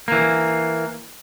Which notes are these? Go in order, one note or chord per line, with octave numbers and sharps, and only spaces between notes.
E3 A#3